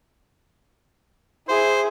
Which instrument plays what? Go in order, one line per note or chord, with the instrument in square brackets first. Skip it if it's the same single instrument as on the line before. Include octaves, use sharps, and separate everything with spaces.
[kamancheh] E4 G#4 [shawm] C5